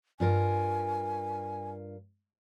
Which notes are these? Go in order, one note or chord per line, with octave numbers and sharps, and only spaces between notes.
G2 F4 A#4 G#5